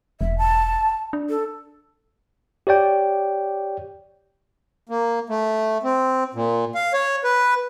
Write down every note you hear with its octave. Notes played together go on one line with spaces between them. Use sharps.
E1 E5
A5
D4
A4
G4 C#5 D5 G5
A#3
A3
C4
A#2
F5
C#5
B4